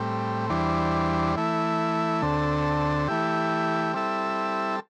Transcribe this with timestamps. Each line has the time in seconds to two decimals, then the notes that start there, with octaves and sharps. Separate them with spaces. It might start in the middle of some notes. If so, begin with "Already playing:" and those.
Already playing: A2 G3 C4
0.50 E2 E3 G3 D4 C5
1.36 E3 A3 E4
2.22 D2 D3 C4 A4
3.08 E3 A3 E4 G4
3.94 G3 C4 E4 A4 E5